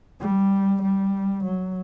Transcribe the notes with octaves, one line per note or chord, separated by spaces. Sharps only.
G3
G3
F#3